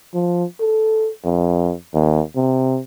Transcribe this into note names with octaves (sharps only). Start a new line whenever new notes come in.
F3
A4
F2
D#2
C3